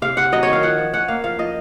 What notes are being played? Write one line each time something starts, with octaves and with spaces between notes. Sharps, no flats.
C3 F5
C3 F#5
F#3 D#5
D#3 C#5
F5
F3 F#5
F3
C#4 F#5
A#3 F5
F3 F5
F3 D#5